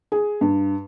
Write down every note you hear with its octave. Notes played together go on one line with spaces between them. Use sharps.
G#4
G2